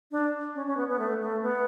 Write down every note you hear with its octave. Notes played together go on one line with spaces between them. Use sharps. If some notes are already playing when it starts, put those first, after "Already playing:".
D4
C#4
C#4
B3
B3
A3
A3
B3